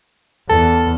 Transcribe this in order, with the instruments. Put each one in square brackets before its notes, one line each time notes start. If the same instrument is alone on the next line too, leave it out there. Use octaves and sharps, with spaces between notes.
[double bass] E2 [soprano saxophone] A4